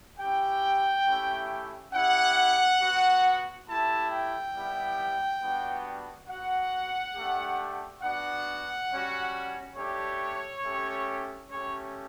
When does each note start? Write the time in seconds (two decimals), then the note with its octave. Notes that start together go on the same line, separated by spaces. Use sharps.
0.18 C#4 E4 G4 G5
1.06 A3 C#4 E4 G4
1.92 C#4 E4 G4 F#5
2.79 B3 F#4
3.67 A3 E4 G4 A5
4.10 G5
4.53 G3 B3 E4 G4
5.41 G3 B3 D4 F#4
6.28 B3 F#4 F#5
7.15 A3 D4 G4
8.02 B3 D4 F#4 F#5
8.89 G3 C#4 F#4
9.76 A3 D4 G4 C#5
10.63 A3 C#4 G4
11.50 A3 C#4 G4 C#5